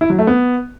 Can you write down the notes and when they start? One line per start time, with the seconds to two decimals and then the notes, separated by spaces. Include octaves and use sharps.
0.01 E4
0.10 F#3
0.19 A3
0.27 B3